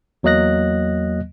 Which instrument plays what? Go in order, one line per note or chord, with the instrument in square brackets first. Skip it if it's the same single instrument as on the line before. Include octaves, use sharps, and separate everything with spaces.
[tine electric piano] E2 F#3 A#3 D#5 F#6 A#6